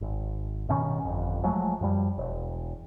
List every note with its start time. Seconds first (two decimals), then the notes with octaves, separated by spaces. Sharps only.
0.01 G#1
0.69 G2 B2 D#3 C#4
1.05 G1 F2
1.44 F3 F#3 G#3 A3
1.81 F#2 F3 G3
2.18 E1